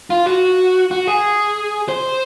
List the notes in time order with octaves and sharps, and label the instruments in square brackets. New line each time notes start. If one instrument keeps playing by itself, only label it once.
[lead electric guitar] F4
F#4
F#4
G#4
C5